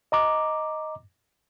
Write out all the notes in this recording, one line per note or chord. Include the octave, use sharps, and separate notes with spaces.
D#5 A#5 D6